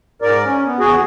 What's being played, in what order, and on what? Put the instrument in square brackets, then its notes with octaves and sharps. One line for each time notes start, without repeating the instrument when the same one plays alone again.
[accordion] G#2 A#4 D5
C#4
B3
E2 F#4 G#4